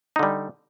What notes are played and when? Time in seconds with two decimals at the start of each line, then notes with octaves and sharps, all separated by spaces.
0.16 D#4
0.19 D3
0.23 G3